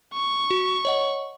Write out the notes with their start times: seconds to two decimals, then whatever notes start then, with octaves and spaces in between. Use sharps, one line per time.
0.14 C#6
0.51 F#4
0.85 C#5 D#5 F#5